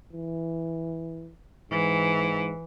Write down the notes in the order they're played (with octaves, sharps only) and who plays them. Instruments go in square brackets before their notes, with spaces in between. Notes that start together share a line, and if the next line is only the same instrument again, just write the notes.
[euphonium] E3
[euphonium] G#2 [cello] E3